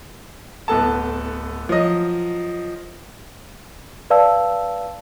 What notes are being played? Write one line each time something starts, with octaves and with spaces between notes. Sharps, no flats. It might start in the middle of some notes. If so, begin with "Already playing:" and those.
D1 B3 A4 A5
F3 F#3 D#5
B4 D5 F5 A5 E6